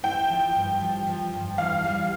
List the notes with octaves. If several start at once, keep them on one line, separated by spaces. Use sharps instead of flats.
E4 G5
F3
G2
F3
F3
G2
E3 F5
G3